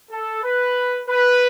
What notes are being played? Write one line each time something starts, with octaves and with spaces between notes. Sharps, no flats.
A4
B4
B4